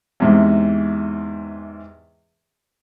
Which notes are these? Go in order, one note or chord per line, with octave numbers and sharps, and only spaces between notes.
E2 G#2 C3